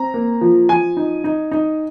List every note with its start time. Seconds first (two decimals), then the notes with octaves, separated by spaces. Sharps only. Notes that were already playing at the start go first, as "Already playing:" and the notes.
Already playing: C4 A#5
0.14 A#3
0.41 F3
0.69 F3 G#5
0.97 D#4
1.24 D#4
1.52 D#4